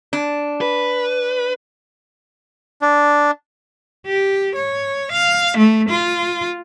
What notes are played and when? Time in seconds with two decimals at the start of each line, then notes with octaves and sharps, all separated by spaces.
0.13 D4
0.61 B4
2.82 D4
4.06 G4
4.55 C#5
5.12 F5
5.58 A3
5.89 F4